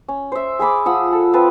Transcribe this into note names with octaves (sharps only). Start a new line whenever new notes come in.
C#4
C5 E5
G#4 G#5 B5 D6
F3 F#5 D#6 E6
A4
C4 F4 B4 A5